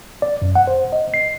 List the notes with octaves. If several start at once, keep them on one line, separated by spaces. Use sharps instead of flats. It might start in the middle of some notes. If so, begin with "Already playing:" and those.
D5
F#2
F#5
C5
D#5
C7